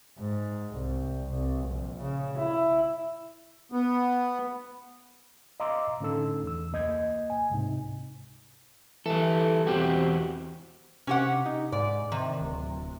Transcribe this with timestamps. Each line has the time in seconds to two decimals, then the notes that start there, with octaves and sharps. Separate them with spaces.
0.18 G#2
0.74 C2
1.28 C2
1.66 A#1
2.00 C#3
2.38 E4
3.72 B3
5.60 D#5 F5 A#5 C6 D6 E6
6.00 A2 D3 C#4 D#4 A4 E6
6.43 E2 E6
6.72 C#2 A#3 D#5 G6 G#6
7.30 G#5
7.50 C#2 G#2 C3 D#4
9.06 E3 G3 A4
9.67 E2 C4 F#4 G4
11.07 C3 C#4 G4 F#5
11.46 D#4
11.72 G#2 D5
12.12 C3 D#3
12.41 D1